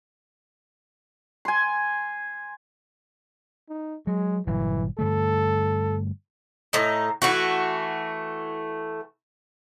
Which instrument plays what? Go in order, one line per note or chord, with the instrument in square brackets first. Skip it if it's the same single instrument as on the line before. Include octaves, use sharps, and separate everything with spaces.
[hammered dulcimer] G#5 C6
[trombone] D#4
[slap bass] F#3 [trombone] G#3
[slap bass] G1 A#2 F#3 [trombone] E3
[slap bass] G2 D3 A3 [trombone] A4
[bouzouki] A2 D#4
E3 A3 F#4